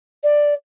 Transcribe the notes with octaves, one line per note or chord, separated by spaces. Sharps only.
D5